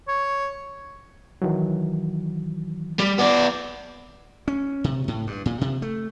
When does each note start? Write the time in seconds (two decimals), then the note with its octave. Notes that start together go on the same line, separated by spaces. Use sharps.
0.08 C#5
1.42 D#3 E3 F#3
2.99 G3
3.18 B3 D5
4.48 C#4
4.84 C3
5.08 A2
5.27 G2
5.46 A#2
5.61 C3
5.82 A3